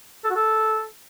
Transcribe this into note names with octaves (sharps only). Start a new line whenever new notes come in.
A4
F#4
A4